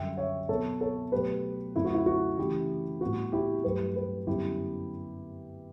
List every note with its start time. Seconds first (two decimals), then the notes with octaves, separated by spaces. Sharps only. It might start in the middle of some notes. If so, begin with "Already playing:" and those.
Already playing: F#2 D3 G3 E5 G5
0.17 C#5 E5
0.49 B2 F#3 B3 A4 C#5
0.81 A4 C#5
1.12 B2 F#3 A3 G4 B4
1.75 F#2 D3 A3 E4
1.85 F#4
1.94 E4
2.06 F#4
2.38 C#3 E3 A3 E4 G4
3.01 A2 G3 B3 F#4
3.32 E4 G4
3.64 G2 F#3 A3 G4 B4
3.96 G4 B4
4.27 F#2 D3 G3 B3 E4 G4